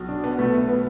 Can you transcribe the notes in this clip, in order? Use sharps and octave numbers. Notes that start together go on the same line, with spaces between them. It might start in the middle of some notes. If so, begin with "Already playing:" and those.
Already playing: B1 B2
D4
B3
A3
B3
B3